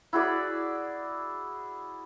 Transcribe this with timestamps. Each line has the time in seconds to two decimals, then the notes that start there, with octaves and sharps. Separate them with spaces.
0.13 E4 F#4 G#4 D5